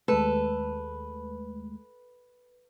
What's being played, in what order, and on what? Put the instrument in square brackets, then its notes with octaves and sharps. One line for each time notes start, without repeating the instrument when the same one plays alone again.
[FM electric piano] D#2 G#3 A3 [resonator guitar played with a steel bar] A4 [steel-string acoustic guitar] B4